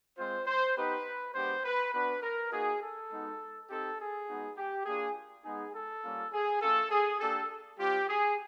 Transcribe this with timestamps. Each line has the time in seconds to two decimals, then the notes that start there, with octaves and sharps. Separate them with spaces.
0.18 G#3 C4 F4 C5
0.46 C5
0.76 B3 D#4 G4 B4
1.34 G#3 B3 D4 G4 C5
1.63 B4
1.93 B3 D4 F#4 B4
2.22 A#4
2.51 A#3 D#4 F#4 G#4
2.80 A4
3.10 G#3 B3 D#4 F#4
3.69 C4 D#4 G4 A4
3.99 G#4
4.27 G#3 B3 D#4 F#4
4.57 G4
4.85 A#3 D4 F4 G#4
5.44 G#3 B3 D#4 G#4
5.74 A4
6.04 G3 A#3 C#4 F4
6.32 G#4
6.61 A3 C#4 F4 A4
6.91 G#4
7.20 A#3 D4 G4 A4
7.79 G3 C4 F4 G4
8.08 G#4